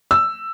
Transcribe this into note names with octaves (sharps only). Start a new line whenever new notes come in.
E6